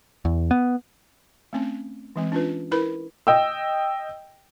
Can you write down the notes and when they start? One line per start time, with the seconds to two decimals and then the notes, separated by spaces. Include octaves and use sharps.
0.25 E2
0.51 B3
1.53 A3 C4 C#4
2.16 E3 G#3 C4
2.32 C#4 D4 F4 B4
2.71 E4 A#4 B4 B5
3.27 D#5 G5 E6